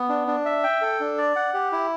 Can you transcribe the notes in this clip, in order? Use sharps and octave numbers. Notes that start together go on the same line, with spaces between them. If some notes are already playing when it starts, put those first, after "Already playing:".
Already playing: B3
D4
D4
E5
G5
A4
D4
D5
F#5
G4
E4